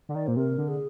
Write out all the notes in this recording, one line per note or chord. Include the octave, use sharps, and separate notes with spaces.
D3
D#3 D5
A#2 C5
C3 A#4
D3
G#4